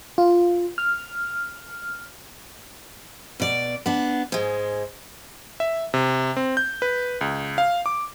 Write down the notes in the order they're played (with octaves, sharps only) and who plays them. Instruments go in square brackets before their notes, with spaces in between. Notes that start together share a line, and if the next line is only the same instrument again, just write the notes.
[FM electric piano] F4
F6
[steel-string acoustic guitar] B2 D5
B3 D4
G#2 G#3
[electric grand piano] E5
C3
C4
G6
B4
C#2
F5
D6